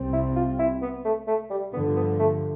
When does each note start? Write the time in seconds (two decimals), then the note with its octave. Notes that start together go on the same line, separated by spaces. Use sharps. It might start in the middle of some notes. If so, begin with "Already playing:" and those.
Already playing: C2 C3 G3 C4
0.13 E4
0.36 F4
0.59 E4
0.82 B3
1.05 A3
1.27 A3
1.51 G3
1.73 G2 D3 F3 B3
1.96 B3
2.19 A3